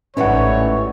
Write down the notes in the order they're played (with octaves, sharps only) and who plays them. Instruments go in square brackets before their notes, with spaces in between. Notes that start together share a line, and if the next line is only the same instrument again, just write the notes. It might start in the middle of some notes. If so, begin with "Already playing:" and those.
[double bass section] A1 G#2 [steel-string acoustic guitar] C#3 E3 G3 [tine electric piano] C#4 F#5 [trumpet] C#5